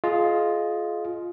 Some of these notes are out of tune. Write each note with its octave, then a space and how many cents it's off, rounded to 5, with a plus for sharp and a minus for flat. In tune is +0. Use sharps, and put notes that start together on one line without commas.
F4 +0 G#4 +30 D#5 +0